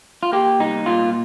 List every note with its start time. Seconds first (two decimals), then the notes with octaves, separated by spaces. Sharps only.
0.23 F4
0.32 A#3 G4
0.59 C2 D#4
0.86 A#2 F4